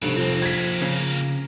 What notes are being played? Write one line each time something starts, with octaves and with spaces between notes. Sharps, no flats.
F1 G2 B2
F3 A#3 C4
G#6 B6
C#3